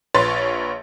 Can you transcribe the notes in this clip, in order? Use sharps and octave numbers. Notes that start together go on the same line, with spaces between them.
A#1 B4 C#5 C6 A6